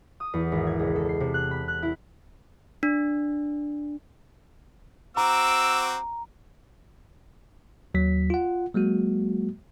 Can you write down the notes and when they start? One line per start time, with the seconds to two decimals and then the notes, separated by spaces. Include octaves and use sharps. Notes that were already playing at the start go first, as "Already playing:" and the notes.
0.20 D#6
0.33 E2
0.52 G#1
0.67 G#6
0.79 C#2
0.96 A4
1.09 C7
1.20 C3
1.34 F#6
1.51 B5
1.68 F#6
1.82 E4
2.83 D4
5.17 C4 F#4 A#5 D6 E6
7.94 D#2 F#3 B6
8.30 F4 F#5
8.74 F#3 G#3 A#3 F#4